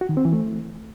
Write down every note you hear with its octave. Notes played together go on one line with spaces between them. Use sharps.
F#4
D#3
C4
E3
A3